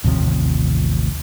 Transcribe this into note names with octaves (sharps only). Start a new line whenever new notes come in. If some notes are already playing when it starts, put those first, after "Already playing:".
A1 D#2 C3 F3